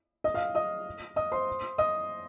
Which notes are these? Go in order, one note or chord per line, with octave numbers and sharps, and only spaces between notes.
D#5 D#6
F5 F6
D#5 D#6
D#5 D#6
C5 C6
D#5 D#6